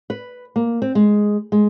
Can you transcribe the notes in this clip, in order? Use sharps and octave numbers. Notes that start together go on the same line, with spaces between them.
B4
A#3
C4
G#3
G#3